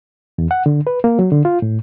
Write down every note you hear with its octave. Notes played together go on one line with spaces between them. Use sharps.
E2
F#5
D3
B4
A#3
F#3
D3
F4
A2